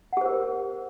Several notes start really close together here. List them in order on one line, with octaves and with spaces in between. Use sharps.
F#5 G4 C5 A#4